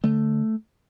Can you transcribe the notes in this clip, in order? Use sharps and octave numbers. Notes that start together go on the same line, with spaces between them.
D3 A3